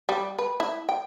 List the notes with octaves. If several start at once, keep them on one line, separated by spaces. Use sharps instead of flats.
G3
B4
E4
G5